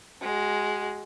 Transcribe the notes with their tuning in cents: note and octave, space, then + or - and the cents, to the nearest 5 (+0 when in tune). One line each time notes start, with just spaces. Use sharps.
G#3 +5 F#4 +35